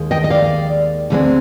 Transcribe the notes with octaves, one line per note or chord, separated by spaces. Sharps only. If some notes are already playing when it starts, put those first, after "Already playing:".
Already playing: D#2 D#3 G#3
D#5 G5
D#5
D5 F5
D2 D3 G#3 C4